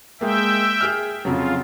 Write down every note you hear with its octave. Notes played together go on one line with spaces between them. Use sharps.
G#3 A#3 E5 G5
G#4 F6
F2 C#3 F#3 F4